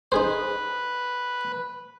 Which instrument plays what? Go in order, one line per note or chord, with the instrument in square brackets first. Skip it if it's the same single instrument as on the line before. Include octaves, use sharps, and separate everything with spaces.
[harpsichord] D#4 G#4 C5 [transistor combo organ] B4